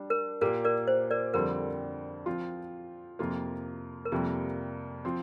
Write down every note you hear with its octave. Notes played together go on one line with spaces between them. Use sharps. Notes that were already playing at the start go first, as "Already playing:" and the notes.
Already playing: G3 D4
A#4
A#2 A#3 G4 A#4
A#4 D5
C5
A#4 D5
F2 D3 G3 C4 A#4
F3 C4 F4
F2 C3 A#3 F4
A#4
F2 C3 G3 A#3 G4
F3 C4